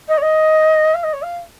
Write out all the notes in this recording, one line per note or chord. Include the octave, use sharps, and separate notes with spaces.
D#5
C#5
D#5
F5
D#5
C#5
F5